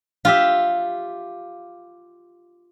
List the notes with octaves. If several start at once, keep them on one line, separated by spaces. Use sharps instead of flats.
F4 G4 E5